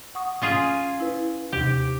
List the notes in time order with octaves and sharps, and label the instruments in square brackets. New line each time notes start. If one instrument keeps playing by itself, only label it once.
[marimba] F#5 C#6 D#6
[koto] C#4 F4 G#4
[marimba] E4 B4
[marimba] D#2 C3 [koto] G4